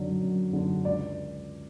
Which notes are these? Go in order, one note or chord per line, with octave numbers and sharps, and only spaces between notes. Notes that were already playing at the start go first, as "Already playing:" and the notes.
Already playing: F#2 D3 F#3 D5
F#2
D3 F#3
C#2 D5